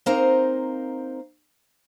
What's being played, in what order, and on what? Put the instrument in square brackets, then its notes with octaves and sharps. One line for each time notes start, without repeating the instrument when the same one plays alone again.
[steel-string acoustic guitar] A#3 C4 D#4 A#4 C5 A#5